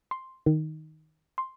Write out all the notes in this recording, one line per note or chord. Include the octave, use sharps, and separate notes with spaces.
C6
D#3
C6